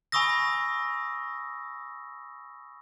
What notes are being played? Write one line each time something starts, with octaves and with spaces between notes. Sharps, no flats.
G#5 B5 C#6 D#6 E6 A#6